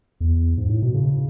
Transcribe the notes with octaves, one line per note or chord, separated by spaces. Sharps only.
E2
G#2
A2
B2
C#3